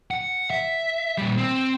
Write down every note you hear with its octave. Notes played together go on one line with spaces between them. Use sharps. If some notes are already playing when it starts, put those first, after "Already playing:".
F#5
E5
A#2 G3
C4